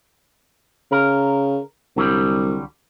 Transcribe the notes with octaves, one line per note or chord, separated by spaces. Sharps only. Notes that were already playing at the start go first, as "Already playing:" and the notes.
C#3 A#4
C2 D3 F#3 G3